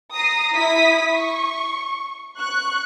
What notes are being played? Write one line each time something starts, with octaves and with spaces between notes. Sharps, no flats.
A#5 D#6 A#6 C7
E4 D#6 B6
C#6
C#6 F#6